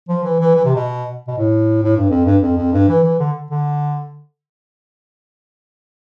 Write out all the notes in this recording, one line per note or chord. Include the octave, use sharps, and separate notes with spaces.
F3
E3
E3
E3
C3
B2
B2
A2
A2
G2
F2
G2
F2
F2
G2
E3
E3
D3
D3